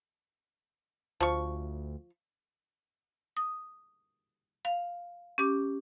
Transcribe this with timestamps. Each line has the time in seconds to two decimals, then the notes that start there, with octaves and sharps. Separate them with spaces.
1.20 D2 F3 C#6
3.37 D#6
4.65 F5
5.38 C#4 G4 D6